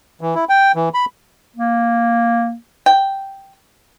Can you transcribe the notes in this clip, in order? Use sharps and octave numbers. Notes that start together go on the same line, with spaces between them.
E3
E4
G5
E3
B5
A#3
G5